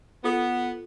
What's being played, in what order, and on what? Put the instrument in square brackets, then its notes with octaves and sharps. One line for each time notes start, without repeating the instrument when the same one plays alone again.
[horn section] B3 [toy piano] F4 A4